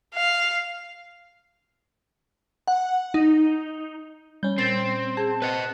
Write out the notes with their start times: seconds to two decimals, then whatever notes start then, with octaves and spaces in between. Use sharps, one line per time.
0.14 F5
2.68 F#5
3.14 D#4
4.43 G3 C#4 G6
4.58 A#2 C4 A6
5.17 G#4 A5
5.42 C4 B4 D#5 F#6 C#7